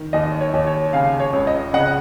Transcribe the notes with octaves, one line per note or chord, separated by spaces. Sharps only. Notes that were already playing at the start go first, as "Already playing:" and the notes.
Already playing: D#3
D#2 D#5
C#5
D#2
C#5
C#3 F5 G#5
C#5
C#2
D#5
C#3 D#5 F#5